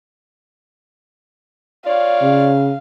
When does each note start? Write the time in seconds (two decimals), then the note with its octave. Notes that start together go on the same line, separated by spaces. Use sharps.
1.86 F4 C#5 D5 F5
2.22 C#3